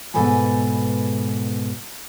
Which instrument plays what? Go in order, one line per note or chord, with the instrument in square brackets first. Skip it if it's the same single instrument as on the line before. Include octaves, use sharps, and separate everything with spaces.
[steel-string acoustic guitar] G#2 B2 A4 B4 G#5